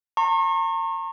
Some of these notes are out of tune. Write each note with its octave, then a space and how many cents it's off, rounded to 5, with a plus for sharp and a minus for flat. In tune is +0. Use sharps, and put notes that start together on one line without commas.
A#5 -40 C#6 -40